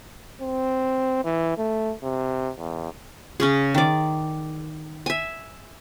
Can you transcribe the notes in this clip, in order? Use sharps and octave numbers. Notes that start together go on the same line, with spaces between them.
C4
E3
A3
C3
E2
C#3 C#4 G#4
D#3 D5
E5 G#5